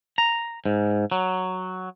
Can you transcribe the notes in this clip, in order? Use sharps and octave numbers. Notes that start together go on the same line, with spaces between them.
A#5
G#2
F#3